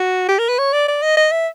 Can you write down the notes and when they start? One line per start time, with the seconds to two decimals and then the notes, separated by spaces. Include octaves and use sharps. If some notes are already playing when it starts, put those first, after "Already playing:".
Already playing: F#4
0.29 G4
0.39 A#4
0.49 B4
0.58 C#5
0.73 D5
0.88 D5
1.02 D#5
1.17 D#5
1.32 E5